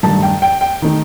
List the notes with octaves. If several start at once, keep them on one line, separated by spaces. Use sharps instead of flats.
G2 D#3 A3 D#4 A5
G5
G5
G5
D#3 A3 D#4